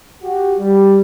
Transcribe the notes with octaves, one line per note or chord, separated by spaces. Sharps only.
F#4 G4
G3